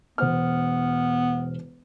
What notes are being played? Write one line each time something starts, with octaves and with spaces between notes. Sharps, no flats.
E1 B3 C5 F6